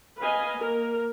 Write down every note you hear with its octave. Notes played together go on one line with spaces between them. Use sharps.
B4 D#5 F5 G#5
A#3 A#4